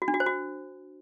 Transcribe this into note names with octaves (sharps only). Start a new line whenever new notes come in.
F#4
D4
F#4
C5
F#4